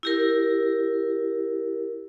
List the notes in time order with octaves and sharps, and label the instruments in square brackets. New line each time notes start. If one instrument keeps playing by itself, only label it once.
[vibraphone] E4 G4 A#4